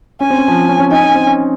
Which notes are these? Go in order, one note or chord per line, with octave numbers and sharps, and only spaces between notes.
C#4 G#5
C4
C#4
F3
C#4
C#4
D#4 G#5
C#4
C4
C#4